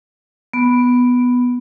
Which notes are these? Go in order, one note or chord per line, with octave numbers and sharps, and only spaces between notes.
B3